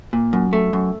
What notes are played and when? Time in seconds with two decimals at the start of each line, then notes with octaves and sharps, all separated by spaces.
0.13 A#2
0.33 F#2
0.53 A3
0.73 F#2